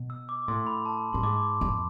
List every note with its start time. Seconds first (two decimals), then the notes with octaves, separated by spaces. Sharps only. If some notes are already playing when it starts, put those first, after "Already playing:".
Already playing: B2
0.10 E6
0.29 D6
0.48 A2 C6
0.67 B5
0.86 A5
1.13 A2 C6
1.23 G#2 D6
1.42 D6
1.61 F2